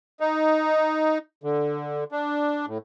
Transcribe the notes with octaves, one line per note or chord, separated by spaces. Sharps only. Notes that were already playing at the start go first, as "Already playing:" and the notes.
D#4
D3
D4
A2